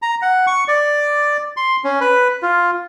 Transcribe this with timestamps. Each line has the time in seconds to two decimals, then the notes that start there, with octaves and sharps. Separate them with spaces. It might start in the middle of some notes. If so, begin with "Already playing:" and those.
0.02 A#5
0.22 F#5
0.47 C#6
0.68 D5
1.57 C6
1.84 C#4
2.01 B4
2.42 F4